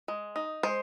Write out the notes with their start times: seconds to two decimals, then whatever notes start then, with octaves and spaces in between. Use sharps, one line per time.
0.08 G#3
0.36 D#4
0.63 G#3 C5